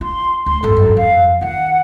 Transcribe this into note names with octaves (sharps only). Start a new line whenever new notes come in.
F4 C6
D2 C6
G#1 F#2 A4
F#2
F2 F5
D#3 F4 F#5